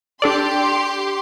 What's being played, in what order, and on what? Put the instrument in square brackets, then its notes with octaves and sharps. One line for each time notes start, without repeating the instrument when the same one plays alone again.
[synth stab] D4 A4 D5 [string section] G4 C6